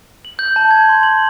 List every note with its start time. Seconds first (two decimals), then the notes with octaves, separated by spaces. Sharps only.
0.25 F#7
0.39 G6
0.56 A5
0.71 G#6
0.89 C6
1.03 F#7